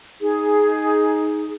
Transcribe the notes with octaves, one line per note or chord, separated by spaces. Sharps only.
D#4 G#4